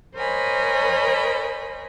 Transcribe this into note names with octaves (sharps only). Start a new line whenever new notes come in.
A#4 C5 C#5 D#5 G#5 B5